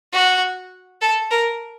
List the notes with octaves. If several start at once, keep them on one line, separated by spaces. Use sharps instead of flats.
F#4
A4
A#4